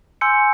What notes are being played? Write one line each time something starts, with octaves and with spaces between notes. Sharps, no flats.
G#5 C6 E6 G6 C#7